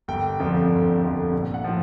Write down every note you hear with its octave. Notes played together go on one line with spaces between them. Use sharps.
G1 G5
F2 D3 F3
G1
F2 D3 F3
A#1
F#5
A2 F3